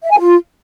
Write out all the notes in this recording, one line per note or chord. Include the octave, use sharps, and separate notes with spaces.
E5
G#5
F4